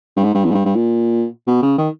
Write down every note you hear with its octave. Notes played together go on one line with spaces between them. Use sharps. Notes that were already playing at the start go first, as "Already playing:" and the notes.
G2
G#2
G2
E2
G#2
G2
G2
A#2
B2
C#3
D#3